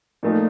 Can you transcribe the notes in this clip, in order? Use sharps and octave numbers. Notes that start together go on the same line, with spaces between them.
A#2 F3 A3 D#4